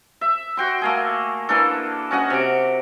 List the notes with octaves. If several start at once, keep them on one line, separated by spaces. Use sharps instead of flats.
E5
F#4 G5 C6
A3 A#3 G#4
E3 A#3 D4 A4
C#4 F#4 D#5 F#5
C3 D6